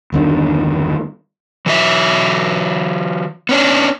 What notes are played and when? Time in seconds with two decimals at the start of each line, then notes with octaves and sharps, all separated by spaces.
0.12 G1 E2 D#3 D4
1.66 E3 F#3 E5
3.49 B3 C#4 D4